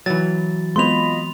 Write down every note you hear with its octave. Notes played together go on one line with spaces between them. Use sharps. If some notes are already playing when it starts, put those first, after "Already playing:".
E3 F#3 A6
G#3 B3 C4 F4 D#5 B5 C6 F7